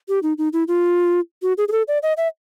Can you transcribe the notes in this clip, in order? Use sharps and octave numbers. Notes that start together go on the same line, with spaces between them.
G4
D#4
D#4
E4
F4
F#4
G#4
G#4
A4
D5
D#5
E5